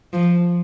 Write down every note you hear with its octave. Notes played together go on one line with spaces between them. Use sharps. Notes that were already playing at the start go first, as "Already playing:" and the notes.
F3